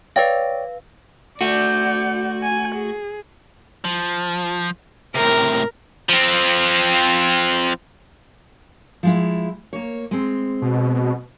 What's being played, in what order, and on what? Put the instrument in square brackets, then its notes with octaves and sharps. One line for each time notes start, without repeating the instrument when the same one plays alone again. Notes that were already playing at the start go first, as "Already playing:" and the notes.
[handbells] B4 F5 [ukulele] C#5 D5 G5
[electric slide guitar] A3 F#4 [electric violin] D5 G6
[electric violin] G#5
G#4
[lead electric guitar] F3
[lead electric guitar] A2 C3 [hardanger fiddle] A#4
[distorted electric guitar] F3 C4
[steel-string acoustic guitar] F3 G#3 E4
A#3 C#5
G#3 C4
[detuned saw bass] B2